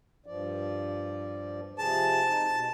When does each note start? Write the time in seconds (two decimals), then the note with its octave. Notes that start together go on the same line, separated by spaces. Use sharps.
0.26 G2 F3 D5
1.78 C3 F3 G#4 A5
2.28 D#4
2.50 B2